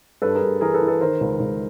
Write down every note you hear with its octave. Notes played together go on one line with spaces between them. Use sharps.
G2 A4 B4
G#4 A#4
G2
E3 G#4 A#4
A4 B4
E3
A4 B4
D#3 A#4 C5
C#2
C#2